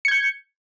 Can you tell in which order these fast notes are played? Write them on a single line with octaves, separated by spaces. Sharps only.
C#7 G#6 G6